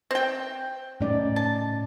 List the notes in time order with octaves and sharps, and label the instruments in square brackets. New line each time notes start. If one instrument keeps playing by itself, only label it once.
[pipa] C4 G5
[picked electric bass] A2 [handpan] C#4 D#4 D5
[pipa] A5